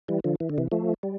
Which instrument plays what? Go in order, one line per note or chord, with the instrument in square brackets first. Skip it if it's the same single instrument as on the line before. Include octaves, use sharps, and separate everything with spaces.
[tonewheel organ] E3 G3
D3 F3
E3
D3
C3 E3
F3 A3
G3